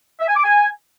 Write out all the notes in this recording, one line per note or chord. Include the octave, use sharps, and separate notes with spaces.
E5
G#5
D6
G#5